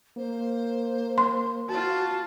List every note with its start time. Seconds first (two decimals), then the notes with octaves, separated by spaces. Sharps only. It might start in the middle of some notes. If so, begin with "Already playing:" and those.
0.17 A#3 C5
1.18 C6
1.69 F4 F#4 A5